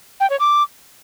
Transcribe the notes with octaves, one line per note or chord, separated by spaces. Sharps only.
G5
C#5
D6